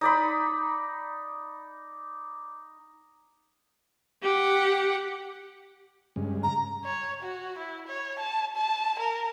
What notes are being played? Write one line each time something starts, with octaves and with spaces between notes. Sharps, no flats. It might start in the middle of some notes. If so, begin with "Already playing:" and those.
D#4 D5 B5
G4 F#5
G2 C#3 G#3
A#5
C#5
F#4
E4
C#5
A5
A5
A#4